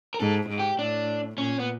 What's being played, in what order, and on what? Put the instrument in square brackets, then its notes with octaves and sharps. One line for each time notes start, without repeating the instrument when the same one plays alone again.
[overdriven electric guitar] A#4
[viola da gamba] G#2 [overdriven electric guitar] A4
[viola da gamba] G#2
[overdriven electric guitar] G4
[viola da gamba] A2 [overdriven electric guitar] D4
[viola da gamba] A#2 [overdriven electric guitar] C#4
[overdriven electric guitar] B3